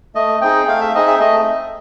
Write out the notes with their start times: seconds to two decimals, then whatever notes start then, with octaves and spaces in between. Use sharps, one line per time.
0.15 A3 D#5
0.41 C4 D#4 G#4 G5
0.67 A3 F5
0.81 E5
0.95 C4 D#4 G#4 D#5
1.07 E5
1.20 A3 D#5